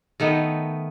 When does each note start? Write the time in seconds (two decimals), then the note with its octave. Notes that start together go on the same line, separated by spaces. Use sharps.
0.20 D#3 A3 B3 D#4